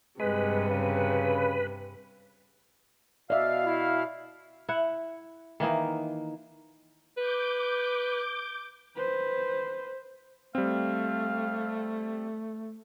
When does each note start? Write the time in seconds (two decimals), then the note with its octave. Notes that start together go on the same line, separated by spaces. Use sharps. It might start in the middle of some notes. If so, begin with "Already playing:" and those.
0.20 G2 C3 G#3 B4
0.70 C#3
3.30 B2 D5 E5 F5 F6
3.66 E4
4.69 E4 F#5
5.60 D#3 E3 A#3 D#4
7.18 B4 D6 G6
8.96 B4 C5
10.55 G3 A3 C4 F5